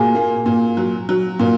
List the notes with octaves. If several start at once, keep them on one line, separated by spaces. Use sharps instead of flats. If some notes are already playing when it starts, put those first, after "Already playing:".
Already playing: A#2 F#4 G#4 G#5
A#3
A#2
F#3
F#3
A#2